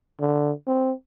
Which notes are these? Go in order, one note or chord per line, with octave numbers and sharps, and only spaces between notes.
D3
C4